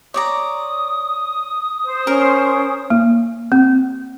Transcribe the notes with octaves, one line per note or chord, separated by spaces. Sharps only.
C#5 D5 A#5 D#6
C5
C#4 A#4
A#3
C4